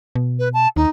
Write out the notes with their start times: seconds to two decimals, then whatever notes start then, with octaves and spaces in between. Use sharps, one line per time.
0.15 B2
0.39 B4
0.54 A5
0.76 D#2 D#4